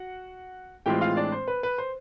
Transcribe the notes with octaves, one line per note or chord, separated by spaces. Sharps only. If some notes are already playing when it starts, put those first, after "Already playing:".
Already playing: F#4 F#5
A2 E3 G#3 C4 F4 G4 G5
F4 F5
D4 D5
C5
B4
B4
C5